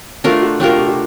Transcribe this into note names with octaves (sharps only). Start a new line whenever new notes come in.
A3 D4 F4 F#4 A#4
F#4
A3 D4 F4 G4 A#4
F#4
G4
F#4